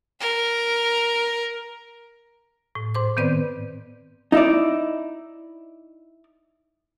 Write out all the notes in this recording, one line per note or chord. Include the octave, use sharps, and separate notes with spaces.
A#4
A2
G#2 C5 D6
D#3 B3 C4 B4 C5 D5
D#4 E4 D5